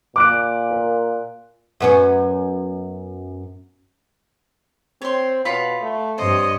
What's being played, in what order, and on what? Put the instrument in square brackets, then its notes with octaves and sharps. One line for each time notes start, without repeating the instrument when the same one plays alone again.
[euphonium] A#2 [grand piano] D6 F#6 D7
[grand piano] A#4
[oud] F#2 B3 C#4
[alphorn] C4 [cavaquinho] C#5 C6
[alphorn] B2 [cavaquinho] F4 C#5 B5
[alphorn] A3
[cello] G2 C#5 [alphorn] C4 [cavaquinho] C5 [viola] D#5